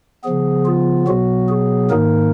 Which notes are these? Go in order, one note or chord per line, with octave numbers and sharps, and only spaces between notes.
C#3 F3 B3 G#4
F4
B2 F#3 B3 F#4
G#4
G#2 D#3 A#3 D#4 A#4